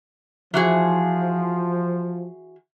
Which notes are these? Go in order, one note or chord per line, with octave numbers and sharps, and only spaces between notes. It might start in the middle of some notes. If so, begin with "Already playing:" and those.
E3 F3 F#4 G#4